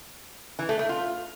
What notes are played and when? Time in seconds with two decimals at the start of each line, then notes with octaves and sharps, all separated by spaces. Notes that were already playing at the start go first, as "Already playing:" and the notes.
0.59 E3
0.69 A3
0.79 A3
0.89 F4